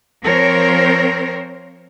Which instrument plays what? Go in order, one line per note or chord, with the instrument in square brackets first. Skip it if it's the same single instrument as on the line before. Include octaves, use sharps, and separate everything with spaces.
[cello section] F3 C4 A#4 C5 C#5